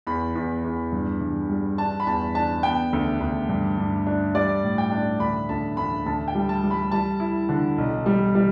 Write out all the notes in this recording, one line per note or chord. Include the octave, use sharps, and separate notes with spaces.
E2 B5
E2
E2
G2
G2
G3
D4 A5
B5
E2 A5
D4 A5
B3 G5
D2
D2
G2
G2
D4
G3 D5
A2
G5
D4
D2 B5
D2 A5
D2 B5
D2 A5
G5
G3
A5
G3
B5
G3 A5
E4
D3
B1
G3
G3